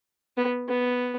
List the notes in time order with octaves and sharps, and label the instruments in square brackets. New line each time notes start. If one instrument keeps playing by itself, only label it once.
[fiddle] B3
B3